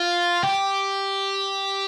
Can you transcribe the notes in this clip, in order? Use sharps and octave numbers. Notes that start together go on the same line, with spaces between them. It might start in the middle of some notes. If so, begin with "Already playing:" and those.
Already playing: F4
G4